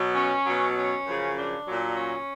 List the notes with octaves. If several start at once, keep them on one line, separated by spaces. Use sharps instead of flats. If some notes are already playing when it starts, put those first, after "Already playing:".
Already playing: B2 F#3
C#4
B2 F#3
C#4
F#2 C#3 F3
D4
A#2 F#3
C#4